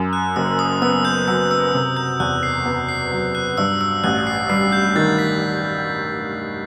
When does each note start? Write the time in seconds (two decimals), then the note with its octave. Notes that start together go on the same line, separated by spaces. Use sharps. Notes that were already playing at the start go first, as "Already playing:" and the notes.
Already playing: F#2
0.13 F#6
0.36 F#1 E6
0.59 D#6
0.82 B3 E6
1.05 G6
1.28 F#3 E6
1.51 E6
1.73 C3
1.97 G6
2.20 E2 F#6
2.43 C7
2.66 B3
2.89 C7
3.12 F#3
3.35 F#6
3.58 G2 E6
3.81 E6
4.04 A1 F#6
4.27 C7
4.50 G3 C7
4.72 G6
4.96 D#3 A6
5.19 B6